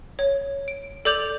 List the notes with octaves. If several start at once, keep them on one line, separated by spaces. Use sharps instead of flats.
C#5
D7
A4 D5 D6 G6 F7 F#7